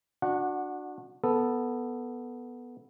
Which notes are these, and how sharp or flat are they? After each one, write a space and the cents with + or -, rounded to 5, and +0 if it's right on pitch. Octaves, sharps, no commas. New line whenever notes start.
D4 +15 F#4 -20 F#5 -5
B3 -5 A4 +0